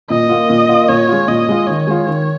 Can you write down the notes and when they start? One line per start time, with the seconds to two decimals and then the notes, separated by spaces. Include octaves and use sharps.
0.10 A#2 D#5
0.29 A#3 F4
0.50 A#2
0.69 A#3 F4
0.89 A#2 C#5
1.09 G#3 F4
1.28 A#2 D#5
1.49 G#3 F4
1.67 D#3 C#5
1.87 G#3 F4
2.06 D#3